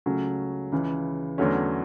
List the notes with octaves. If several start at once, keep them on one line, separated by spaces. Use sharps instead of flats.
C#2 C#3 F#3 A3 C#4
C#2 C#3 E3
E2 D3 F#3 A3 C#4